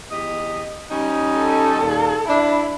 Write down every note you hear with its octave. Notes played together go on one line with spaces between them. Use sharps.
E2 G4 D#5
G3 C#4 D#4
A4
D#2 A#2
D4 E4